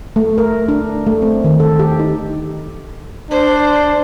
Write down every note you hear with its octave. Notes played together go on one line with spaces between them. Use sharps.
A3
A#4
D4
A3
C4
D#3
A4
G4
D#4
D4 C5